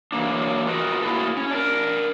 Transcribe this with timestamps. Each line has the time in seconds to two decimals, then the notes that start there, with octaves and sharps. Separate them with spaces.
0.12 E3 F#3 A#3 D4
0.67 F4 F#4 A#4 B4 D#5
1.03 A3 A#3 E4 F#4 G#4 A4
1.37 C#4
1.51 D4 A#4